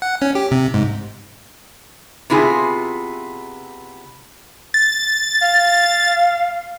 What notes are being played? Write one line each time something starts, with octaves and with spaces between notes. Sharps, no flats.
F#5
C#4
G4
C3
G#2
C3 B3 E4 F4 G#4
A6
F5